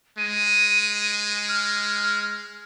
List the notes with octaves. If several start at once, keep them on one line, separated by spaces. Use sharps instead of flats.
G#3 D#7
F6